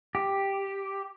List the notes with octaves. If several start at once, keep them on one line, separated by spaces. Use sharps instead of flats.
G4